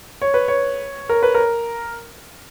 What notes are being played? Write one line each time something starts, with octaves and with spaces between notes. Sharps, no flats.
C#5
B4
C#5
A#4
B4
A#4